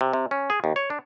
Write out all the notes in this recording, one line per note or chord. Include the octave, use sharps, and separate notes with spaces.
C3
C3
C#4
G#4
D#2
C#5
D4